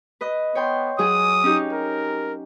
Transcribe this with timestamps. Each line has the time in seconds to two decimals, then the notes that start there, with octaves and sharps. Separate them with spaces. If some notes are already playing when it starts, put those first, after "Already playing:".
0.21 B4 D#5
0.55 B3 C#5 G5 C6
0.99 F#3 G#4 D#6
1.43 C#4 D#4 G4
1.72 A#4